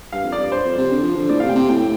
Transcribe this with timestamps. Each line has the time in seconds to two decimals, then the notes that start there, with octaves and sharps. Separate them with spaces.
0.13 G2 F5
0.25 F2
0.32 D5
0.39 G2
0.52 C5
0.65 F2
0.78 C3
0.91 D3
1.03 F3
1.17 D3
1.29 A2 D5
1.40 C3 F5
1.49 G5
1.55 C3
1.69 A2 G5